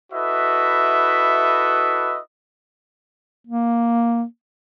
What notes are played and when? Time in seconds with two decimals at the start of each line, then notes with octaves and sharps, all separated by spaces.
0.13 E4 F#4 A4 B4 D#5 E5
3.47 A#3